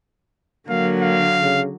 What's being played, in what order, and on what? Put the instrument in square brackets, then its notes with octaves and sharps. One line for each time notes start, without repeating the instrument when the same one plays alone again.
[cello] D3 F#3 [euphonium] A#3 [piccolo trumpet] F5
[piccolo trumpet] F5
[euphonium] C#3